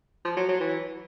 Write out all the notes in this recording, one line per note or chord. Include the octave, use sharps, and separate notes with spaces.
F3
F#3
F#3
E3